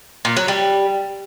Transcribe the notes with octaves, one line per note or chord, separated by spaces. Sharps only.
A#2
F#3
G3